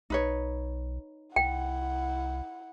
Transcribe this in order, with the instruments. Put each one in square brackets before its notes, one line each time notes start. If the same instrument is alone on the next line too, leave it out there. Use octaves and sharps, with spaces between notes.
[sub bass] B1 [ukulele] D#4 B4 C#5
[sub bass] C2 [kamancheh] E4 F#5 [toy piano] G5